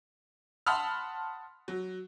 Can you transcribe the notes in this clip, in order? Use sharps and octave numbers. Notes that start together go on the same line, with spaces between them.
F#5 A5 B5 C6 D#6 F6
F#3